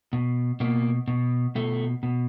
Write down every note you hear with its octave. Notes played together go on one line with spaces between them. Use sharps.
B2
B2 A#3
B2
B2 A3
B2